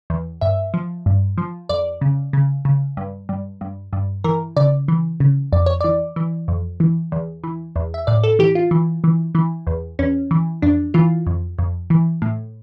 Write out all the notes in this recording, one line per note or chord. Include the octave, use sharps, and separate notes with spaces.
E2
G2 E5
F3
G2
F3
F2 D5
C#3
C#3
C#3
G2
G2
G2
G2
E3 A#4
C#3 D5
E3
C#3
F2 D5
C#5
E3 D5
E3
F2
E3
E2
E3
E2
E5
A2 D5
A4
E3 G4
F4
E3
E3
E3
E2
E2 C#4
E3
F2 D4
E3 F4
F2
F2
E3
A2